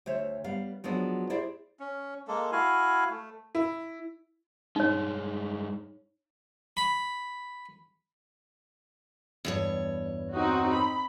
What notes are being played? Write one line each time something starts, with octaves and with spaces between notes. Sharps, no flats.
D2 C5 C#5 E5
G3 B3 F5
F3 F#3 G#3 B3 D4 F#4
E4 G4 G#4 C5 D5 E5
C#4
G#3 A#3 A4
E4 F#4 F5 G#5
A3
E4
G2 G#3 D#4 C#5
B5
E2 G2 C#5
C4 D#4 F#4
B5